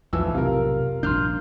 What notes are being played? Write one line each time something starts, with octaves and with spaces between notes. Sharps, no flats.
B1 F2 A2 E3 F3 E6
C3 F4 A#4
A#1 G2 D4 C6 F6 G6